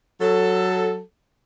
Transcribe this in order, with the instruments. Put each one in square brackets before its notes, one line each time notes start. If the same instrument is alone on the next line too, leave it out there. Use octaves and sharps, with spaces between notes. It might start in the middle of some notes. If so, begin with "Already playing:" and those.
[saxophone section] F#3 A4